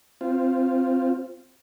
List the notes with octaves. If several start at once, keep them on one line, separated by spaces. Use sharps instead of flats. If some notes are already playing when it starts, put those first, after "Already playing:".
C4 F4